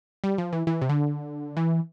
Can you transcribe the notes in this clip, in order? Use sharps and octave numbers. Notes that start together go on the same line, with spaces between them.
G3
F3
E3
E3
C3
D3
E3